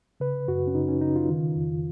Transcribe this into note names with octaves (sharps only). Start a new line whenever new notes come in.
C#3 B4
F#2 F#4
C#4
C#3 D#4
C#4
C#3 D#4
F4
D#3
F2